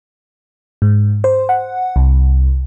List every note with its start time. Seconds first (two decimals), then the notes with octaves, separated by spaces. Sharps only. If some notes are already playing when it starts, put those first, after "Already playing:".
0.82 G#2
1.24 C5
1.49 F#5
1.96 C2